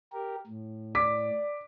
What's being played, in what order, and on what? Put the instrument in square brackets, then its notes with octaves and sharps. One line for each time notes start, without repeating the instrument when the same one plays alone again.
[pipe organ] G4 A#4
A2
[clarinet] D5 [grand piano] D6 B6